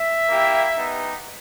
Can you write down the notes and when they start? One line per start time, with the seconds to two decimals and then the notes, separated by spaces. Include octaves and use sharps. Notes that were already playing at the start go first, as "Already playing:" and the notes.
Already playing: E5
0.28 A#3 E4 G4
0.75 B3 D#4 G4